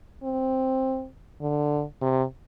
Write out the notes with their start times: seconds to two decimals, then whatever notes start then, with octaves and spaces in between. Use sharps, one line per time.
0.24 C4
1.42 D3
2.02 C3